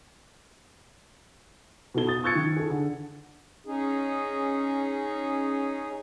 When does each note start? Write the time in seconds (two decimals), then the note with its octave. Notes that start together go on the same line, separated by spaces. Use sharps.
1.94 B2 D#4 A4 G7
2.07 D#6 A6
2.24 C#6 E6 F#6 G#6 A6 C#7
2.35 D#3
2.56 G#4 A4
2.70 D3
3.66 C#4 D#4 G#4